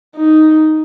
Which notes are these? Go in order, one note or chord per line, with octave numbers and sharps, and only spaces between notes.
D#4